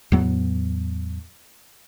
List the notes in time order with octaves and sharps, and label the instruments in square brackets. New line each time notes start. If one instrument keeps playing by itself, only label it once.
[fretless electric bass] E2 A2 F#3 B3